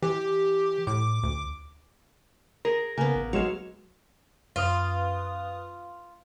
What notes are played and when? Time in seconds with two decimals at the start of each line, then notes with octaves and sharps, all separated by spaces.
0.02 E3 G4
0.87 A2 D6
1.23 D2
2.65 G#4 A#4
2.98 C#3 A#3 B3 G#5
3.15 A1
3.33 F#3 G#3 C#5 F5 E7
4.56 F#2 F4 B4 D#6